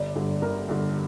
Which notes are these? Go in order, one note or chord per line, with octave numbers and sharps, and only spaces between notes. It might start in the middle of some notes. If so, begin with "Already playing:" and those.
Already playing: G1 D5
G2 D3
G1 A#4
G2 D3